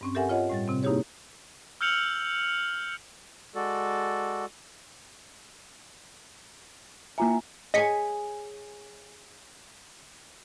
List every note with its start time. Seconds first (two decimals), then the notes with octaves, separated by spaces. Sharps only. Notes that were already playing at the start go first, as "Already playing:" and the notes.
0.01 G2 C4 C#4
0.15 G4 A4 A#4 E5 F#5 G#5
0.29 F4 C#5 D#5 F#5
0.50 A2 G3 A6
0.68 C3 C4
0.83 A#3 D#4 E4 G4 G#4 C#5
1.81 E6 F6 G6 C#7 F7 F#7
3.55 G#3 F#4 A4 D5
7.18 A#3 F4 E5 G#5 A#5
7.74 G#4 C#5 D#5 G#5 B6 C#7